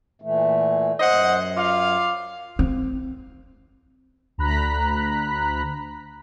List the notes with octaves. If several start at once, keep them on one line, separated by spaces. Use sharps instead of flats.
A#2 E3 A3
F#2 C5 D#5 F#5
F4 D5 F5
C4
D2 A#5 B5 F#6 B6